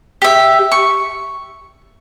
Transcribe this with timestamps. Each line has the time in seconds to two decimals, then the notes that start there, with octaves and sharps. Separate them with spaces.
0.22 G4 E5
0.72 C#6